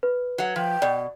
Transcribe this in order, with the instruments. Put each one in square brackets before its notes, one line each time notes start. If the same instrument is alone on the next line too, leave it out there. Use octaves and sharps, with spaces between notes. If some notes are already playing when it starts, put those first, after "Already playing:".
[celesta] B4
[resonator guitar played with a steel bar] F#3 F#5
[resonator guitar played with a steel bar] F3 [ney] G5
[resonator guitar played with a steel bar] B2 [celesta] D5